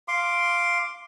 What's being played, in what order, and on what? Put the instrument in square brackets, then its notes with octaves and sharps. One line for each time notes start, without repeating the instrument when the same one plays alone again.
[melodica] F5 C6 D6